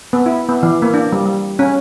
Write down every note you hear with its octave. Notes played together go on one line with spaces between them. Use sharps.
B3
E4
B3
E3
A#3
D4
G3
G3
C#4